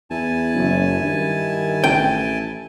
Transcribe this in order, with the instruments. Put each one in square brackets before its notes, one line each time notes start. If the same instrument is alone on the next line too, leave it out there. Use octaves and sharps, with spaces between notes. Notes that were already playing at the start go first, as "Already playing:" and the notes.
[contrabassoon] E2 [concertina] E4 G#5 A5
[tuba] F#1 [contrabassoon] F#2
[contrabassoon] G2 [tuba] D#3
[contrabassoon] A1 [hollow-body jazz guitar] G5